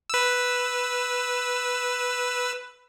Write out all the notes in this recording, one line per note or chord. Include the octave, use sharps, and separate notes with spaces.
B4 E6